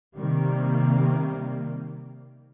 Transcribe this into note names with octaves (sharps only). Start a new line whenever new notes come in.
C3 D#3 G3 A#3